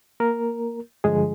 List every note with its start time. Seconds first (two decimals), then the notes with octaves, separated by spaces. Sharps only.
0.20 A#3 A#4
1.04 G2 D3 F3 G#3 G#4